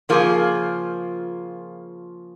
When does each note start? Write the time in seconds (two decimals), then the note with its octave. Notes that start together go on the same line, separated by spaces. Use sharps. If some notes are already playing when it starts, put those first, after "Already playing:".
0.09 C#3 F3 A#3 F4 G#4